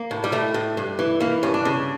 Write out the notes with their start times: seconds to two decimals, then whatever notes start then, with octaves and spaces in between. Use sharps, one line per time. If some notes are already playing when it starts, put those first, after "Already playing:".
Already playing: A#3
0.11 A2
0.24 G3
0.32 A2 A3
0.54 A2
0.77 G2
0.99 E3
1.20 E3 A#3
1.43 G2 C#4
1.54 D4
1.65 C#3